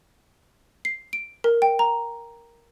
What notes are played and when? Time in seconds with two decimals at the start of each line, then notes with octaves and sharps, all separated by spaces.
0.85 C7
1.13 D7
1.44 A#4
1.62 G5
1.79 A#5